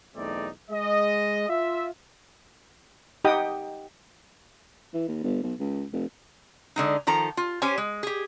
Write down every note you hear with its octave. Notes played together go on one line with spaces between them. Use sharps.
B1 E2 A3 C4 D#4 D5
G#3 D#5
F4 E5
D#4 G4 D#5 F#5 G5 D#6
E3
D#2
G1
B1
C#2
F1
D3 G#3 D#4
D#3 F3 A4 A#5
F4
C#4 G4 C5 C#5 G#5
G#3
G4 G#4